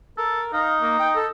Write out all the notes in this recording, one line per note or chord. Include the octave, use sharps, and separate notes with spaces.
A4 A#4
D#4 F5
A#3
G5
A4